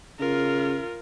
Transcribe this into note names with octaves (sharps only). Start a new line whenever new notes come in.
C#3 F4 A#4